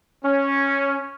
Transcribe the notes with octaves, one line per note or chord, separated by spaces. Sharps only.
C#4